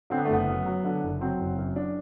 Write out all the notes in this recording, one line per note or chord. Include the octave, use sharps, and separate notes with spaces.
D3 C4
B3
A3
F#1 B3
F#2
F#3
D3
F#1
F#3 C4
F#1
F#2
D4